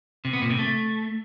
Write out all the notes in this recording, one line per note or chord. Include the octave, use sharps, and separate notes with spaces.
C3
B3
A#2
C3
A3